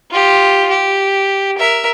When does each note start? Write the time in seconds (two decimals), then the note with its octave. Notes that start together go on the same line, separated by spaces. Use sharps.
0.11 F4 G4
0.69 G4
1.58 A#4 E5